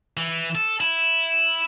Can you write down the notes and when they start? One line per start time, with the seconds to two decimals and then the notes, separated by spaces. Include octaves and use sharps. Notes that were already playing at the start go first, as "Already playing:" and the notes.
0.17 E3
0.55 A4
0.81 E4